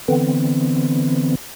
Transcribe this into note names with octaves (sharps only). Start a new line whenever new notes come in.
D3 E3 B3 C4